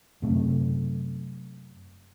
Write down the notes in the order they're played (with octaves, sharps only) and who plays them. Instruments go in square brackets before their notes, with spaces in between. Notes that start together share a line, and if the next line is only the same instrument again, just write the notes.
[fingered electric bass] F#2 C3 A3